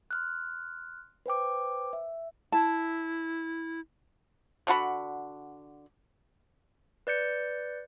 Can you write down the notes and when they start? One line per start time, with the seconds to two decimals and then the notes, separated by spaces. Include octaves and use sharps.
0.11 C6 F6 F#6
1.26 B4 C5 G5 D6
1.93 E5
2.52 E4 A5
4.67 D3 D4 F#4 B5
7.07 B4 D5 G6 C#7